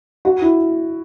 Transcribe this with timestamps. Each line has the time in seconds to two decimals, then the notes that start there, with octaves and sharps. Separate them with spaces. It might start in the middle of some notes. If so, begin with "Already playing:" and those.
0.25 F#4
0.42 E4